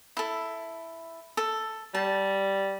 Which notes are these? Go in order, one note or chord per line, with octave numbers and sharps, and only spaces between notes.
E4 A4
A4
G3 A5